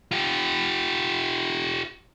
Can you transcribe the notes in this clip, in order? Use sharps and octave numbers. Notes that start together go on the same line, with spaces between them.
F4 G4